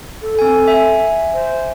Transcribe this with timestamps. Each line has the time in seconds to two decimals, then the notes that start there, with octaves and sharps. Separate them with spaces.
0.21 A4
0.39 C4 G#5
0.68 E5 G#5
1.33 C5